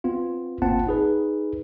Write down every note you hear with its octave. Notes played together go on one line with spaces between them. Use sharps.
B3 C4 F4
G1 A#3 C4 F4 F#5 A5
D#4 G#4 B4